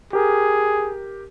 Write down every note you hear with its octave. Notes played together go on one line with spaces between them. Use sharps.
G4 G#4 A#4